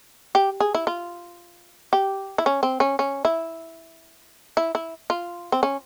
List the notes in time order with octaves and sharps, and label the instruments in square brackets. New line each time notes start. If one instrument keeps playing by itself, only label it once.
[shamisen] G4
G#4
E4
F4
G4
E4
C#4
C4
C#4
C#4
E4
E4
E4
F4
C4
C#4